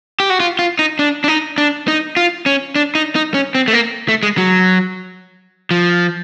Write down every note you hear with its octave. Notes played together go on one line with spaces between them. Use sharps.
G4
F#4
F4
F4
D#4
D4
D4
D#4
D4
D#4
F4
C#4
D4
D#4
D#4
C#4
C4
A3
A#3
A3
G#3
F#3
F3